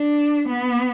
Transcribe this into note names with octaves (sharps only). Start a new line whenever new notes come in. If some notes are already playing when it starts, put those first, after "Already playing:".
Already playing: D4
B3